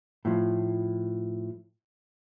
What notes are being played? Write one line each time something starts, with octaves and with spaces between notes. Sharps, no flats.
A2 F3